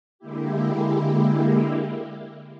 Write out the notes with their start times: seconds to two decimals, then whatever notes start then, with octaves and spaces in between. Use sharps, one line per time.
0.19 D3 G#3 A#3 E4 G4